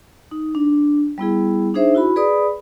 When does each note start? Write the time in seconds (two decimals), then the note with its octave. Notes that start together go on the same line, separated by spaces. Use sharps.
0.31 D#4
0.55 D4
1.18 G3 B3 E4 G#4
1.74 D4 D#4 G#4 C5 E5
1.95 E4 F#4 B5
2.16 G#4 B4 D5 B5 D#6